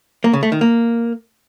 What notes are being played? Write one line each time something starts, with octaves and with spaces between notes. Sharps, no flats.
A#3
C#3
A3
D#3
A#3